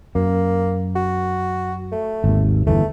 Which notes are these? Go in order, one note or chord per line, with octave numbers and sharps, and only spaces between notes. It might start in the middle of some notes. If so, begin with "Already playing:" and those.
F#2 A#3
F#4
A3
G#1 D#2
G1 E2 E3 A3